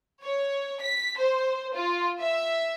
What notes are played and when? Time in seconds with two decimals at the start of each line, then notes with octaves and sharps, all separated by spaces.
0.24 C#5
0.80 B6
1.18 C5
1.74 F4
2.21 E5